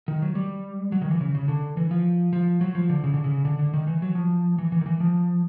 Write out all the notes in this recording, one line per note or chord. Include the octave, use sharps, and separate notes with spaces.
D#3
F#3
G3
F#3
D#3
E3
C#3
C#3
D3
E3
F3
F3
F#3
F3
D3
C#3
D3
C#3
D3
D3
D#3
E3
F#3
F3
E3
E3
D#3
E3
F3